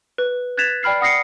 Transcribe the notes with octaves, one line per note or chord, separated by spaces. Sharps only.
B4
F#6 G#6 A6 B6 E7 F7
D5 G5 B5 F6 C7
F#5 D#6 A#6 C7 C#7